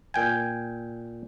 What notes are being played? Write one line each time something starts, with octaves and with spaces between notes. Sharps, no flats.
A#2 G5 G#5